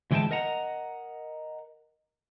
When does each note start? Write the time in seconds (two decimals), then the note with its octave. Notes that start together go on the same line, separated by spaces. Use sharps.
0.11 D2 E3 G#3 A4 G5 A5
0.31 A#4 D#5 F#5 A#5